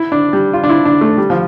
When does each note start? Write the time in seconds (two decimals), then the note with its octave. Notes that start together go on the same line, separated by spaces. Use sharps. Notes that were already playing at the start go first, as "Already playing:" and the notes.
Already playing: E4
0.12 D4
0.33 G3
0.53 F4
0.63 D4
0.70 E4
0.85 D4
1.01 A3
1.18 G3
1.30 F3